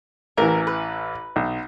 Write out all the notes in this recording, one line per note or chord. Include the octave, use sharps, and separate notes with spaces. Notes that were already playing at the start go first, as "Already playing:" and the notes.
A1 E3 A#4
B4
B1